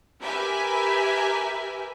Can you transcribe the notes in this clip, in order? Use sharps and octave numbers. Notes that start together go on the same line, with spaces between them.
G4 A#4 B4 E5 G#5